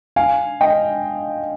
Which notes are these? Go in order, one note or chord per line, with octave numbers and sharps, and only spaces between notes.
F5 G#5
D#5 G5